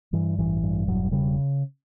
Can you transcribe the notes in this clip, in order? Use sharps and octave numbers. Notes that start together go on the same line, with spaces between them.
G2 E3
A1 E3
G2
E1 F#3
C#3 G3